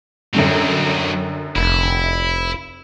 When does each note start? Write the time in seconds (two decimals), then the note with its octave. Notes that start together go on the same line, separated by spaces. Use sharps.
0.34 F#2 D3 F#3 G3 C4
1.56 F1 E4